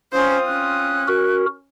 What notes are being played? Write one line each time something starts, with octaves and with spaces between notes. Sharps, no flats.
C4 C#4 F4 C5 D#6
C#4 F#6
F#4 A#4